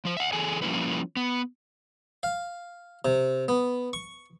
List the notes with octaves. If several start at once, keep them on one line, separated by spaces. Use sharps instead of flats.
F3 C5
E5 F#5
E3 G#4 A4 G#5
F3 G3 A#3 C#4 E4 B4
B3
F5
C3
B3
C#6